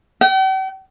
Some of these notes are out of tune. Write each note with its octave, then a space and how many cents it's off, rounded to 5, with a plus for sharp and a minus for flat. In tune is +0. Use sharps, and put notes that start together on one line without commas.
G5 -45